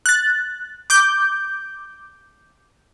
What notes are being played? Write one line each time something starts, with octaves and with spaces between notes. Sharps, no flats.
F#6 A6
D6 G6